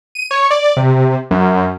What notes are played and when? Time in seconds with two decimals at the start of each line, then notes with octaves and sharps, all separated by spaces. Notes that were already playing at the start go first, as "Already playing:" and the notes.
0.15 D#7
0.31 C#5
0.50 D5
0.77 C3
0.89 C3
1.31 F#2